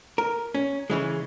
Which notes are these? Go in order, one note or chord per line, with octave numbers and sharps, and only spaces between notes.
A#4
C#4
C#3 E3 G#3